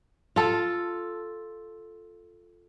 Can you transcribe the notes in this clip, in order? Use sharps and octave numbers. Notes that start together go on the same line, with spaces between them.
F4 A4